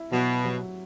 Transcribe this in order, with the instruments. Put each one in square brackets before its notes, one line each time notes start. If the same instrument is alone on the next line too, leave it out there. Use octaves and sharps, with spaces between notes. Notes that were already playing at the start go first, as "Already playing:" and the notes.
Already playing: [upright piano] E4
[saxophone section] B2 [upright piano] F#3
[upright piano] F#3